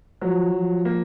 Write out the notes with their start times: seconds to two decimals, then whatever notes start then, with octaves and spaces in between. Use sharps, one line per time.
0.21 F3 F#3
0.54 F3
0.85 A#3